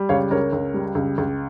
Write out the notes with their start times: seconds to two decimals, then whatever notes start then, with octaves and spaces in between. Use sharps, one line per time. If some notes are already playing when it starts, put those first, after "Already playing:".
Already playing: G3
0.09 C#2 C#5 F5
0.31 C#2 A#4 C#5
0.53 C#2
0.74 G3
0.95 C#2
1.18 C#2